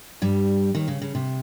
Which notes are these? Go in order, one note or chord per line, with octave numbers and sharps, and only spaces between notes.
G2 G3
D#2 D#3
C#3
C#3
C3